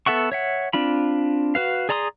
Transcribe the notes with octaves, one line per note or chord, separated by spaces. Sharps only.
B3 A4 E5 F#5 C#6
C#5 E5 F#5
C4 D4 F4 B5
F#4 B4 F5
G#4 D5 A#5 C6 D#6